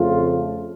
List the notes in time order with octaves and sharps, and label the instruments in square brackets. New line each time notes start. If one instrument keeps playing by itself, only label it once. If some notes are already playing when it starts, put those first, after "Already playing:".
Already playing: [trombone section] F2 C#3 F3 A3 F4